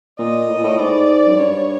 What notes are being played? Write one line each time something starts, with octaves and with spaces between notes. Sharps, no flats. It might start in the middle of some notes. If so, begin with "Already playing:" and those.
A#2 D#5
A2
A#2
A2
G#2 D5
F#2
G2 C#5